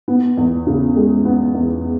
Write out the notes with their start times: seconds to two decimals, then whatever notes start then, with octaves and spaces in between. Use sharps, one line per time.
0.08 B3
0.37 E2
0.67 C#3
0.96 G#3
1.25 B3
1.54 E2